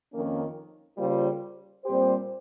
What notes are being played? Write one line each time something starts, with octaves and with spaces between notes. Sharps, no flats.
F2 D#3 A#3 C#4
C#3 G3 A#3 F4 C5
A#2 G3 C4 G4 C5